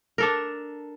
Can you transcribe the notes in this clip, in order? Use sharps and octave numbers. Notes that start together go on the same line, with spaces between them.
D4 A4 A#4